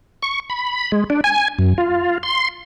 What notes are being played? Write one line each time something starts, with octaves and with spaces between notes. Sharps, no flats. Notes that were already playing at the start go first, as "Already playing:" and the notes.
C#6
B5
G#3
D4
G#5
F#2
F4
C6